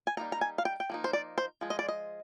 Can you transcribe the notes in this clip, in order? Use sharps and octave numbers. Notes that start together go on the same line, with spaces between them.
G#5
G3 A#3 D#4 A#5
A#5
G#5
F5
G5
G5
F3 A#3 D#4
C5
D5
C5
F3 G#3
D#5
D5
D#5